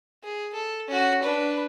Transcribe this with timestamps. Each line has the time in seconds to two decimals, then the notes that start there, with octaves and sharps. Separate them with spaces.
0.24 G#4
0.54 A4
0.88 C#4 F#4
1.23 D4 B4